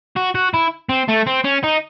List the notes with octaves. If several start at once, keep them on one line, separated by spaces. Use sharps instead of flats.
F#4
F#4
E4
C4
A3
C4
C#4
D#4